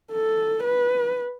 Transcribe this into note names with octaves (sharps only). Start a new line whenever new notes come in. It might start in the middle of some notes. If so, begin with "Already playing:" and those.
A4
B4